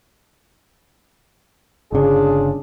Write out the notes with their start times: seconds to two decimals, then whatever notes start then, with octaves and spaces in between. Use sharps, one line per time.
1.92 G1 C#3 D4 F4 G#4